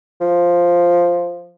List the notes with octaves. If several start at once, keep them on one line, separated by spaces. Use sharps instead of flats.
F3